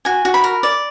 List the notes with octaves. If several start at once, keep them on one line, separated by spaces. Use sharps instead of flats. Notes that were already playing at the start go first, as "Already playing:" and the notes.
F#4 G#5
F#4
B5
A#4
D5